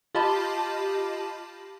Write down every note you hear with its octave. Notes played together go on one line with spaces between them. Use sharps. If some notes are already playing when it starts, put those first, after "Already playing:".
F4 G4 D#5 A5 B5